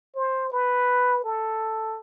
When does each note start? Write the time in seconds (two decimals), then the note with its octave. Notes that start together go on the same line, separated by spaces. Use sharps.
0.16 C5
0.52 B4
1.24 A4